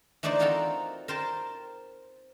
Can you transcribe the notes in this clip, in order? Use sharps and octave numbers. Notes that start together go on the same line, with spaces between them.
E3 A3 D4 D#4 C5 D5
C4 D#4 F4 F#4 A4 A#4
A#4 C5 G5 A5